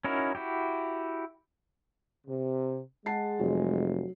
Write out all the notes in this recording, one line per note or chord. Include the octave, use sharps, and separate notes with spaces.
C#4 D#4 E4 F#4 A#4
E4 F#4 G4
C3
G#3 F#5 A5 C7
F1 F#3